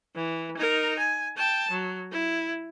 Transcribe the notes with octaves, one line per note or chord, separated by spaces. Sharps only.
E3
D#4 A#4
G#5
G5 A5
F#3
E4